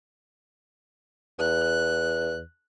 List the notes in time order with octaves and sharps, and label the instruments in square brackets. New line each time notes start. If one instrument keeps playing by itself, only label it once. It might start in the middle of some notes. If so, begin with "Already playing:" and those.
[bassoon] E2 [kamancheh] F#6